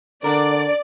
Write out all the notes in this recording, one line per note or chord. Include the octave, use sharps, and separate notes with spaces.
D3 D4 A#4 D5